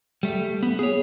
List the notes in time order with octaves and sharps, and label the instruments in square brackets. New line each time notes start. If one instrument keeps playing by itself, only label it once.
[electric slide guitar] G3 A3
B3
G#4 C#5